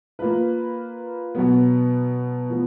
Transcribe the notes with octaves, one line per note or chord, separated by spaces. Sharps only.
A#3 F4 B4
B2 F#3 B3
F3 B3